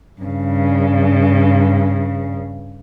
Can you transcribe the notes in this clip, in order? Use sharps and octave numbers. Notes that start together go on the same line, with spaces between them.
G2 C#3